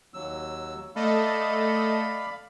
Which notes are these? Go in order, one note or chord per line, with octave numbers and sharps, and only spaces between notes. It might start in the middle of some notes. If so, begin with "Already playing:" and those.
D#2 F#3 E6
A3 A4 D5 D#5 F5 B5